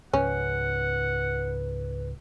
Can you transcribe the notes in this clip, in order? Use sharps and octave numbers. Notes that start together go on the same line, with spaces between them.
C#2 G#2 C#4 B4 F#5